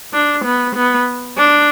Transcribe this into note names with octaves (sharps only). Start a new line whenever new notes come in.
D4
B3
B3
D4